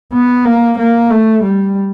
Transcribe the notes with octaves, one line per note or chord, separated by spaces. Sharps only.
B3
A#3
A#3
A3
G3